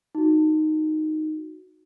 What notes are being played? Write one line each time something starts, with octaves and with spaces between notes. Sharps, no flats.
D#4 F#4